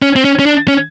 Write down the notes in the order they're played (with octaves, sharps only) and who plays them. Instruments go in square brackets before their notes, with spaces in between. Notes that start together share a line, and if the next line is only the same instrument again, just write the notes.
[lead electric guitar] C#4
C4
C#4
C#4
D4
C#4